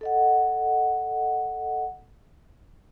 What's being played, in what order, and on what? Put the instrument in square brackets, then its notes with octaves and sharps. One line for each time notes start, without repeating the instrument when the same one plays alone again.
[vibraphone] A4 D#5 F#5